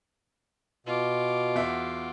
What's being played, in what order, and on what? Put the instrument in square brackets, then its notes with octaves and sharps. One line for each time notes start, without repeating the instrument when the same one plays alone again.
[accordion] B2 [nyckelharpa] F4 D6
[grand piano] E2 F#4 E5